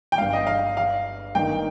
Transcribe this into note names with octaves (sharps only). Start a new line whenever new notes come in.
G5
G1 G2 G3 F5
D#5
F5
F5
G1 G2 D#3 A#3 D#4 G5